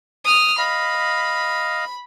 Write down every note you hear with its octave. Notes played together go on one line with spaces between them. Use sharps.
D#6 F6
D#5 F5 B5